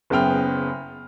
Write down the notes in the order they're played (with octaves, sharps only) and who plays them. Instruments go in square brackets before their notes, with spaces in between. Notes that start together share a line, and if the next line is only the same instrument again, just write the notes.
[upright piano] F#1 C#3 B3 G5 F6